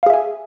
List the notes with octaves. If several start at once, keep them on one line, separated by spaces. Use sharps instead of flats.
G#4 E5 F5 G#5